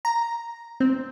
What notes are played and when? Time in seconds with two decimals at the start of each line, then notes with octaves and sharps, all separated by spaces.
0.05 A#5
0.80 C4